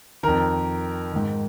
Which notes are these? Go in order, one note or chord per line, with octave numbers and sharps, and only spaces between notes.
F2 D#3 A#4
G#2 D#3